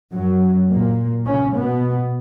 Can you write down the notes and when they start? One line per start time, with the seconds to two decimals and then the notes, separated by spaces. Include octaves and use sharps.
0.13 F#2 F#3
0.71 A#2 A#3
1.27 C#3 C#4
1.56 B2 B3